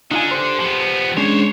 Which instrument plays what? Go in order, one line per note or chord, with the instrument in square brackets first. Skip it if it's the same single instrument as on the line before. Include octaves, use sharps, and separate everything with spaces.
[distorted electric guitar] D3 [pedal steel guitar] D#4 F4 G#5
[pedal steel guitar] G4 C5
[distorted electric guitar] F3 B3
[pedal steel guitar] G#3 C#4 D4 [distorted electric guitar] C5 C#5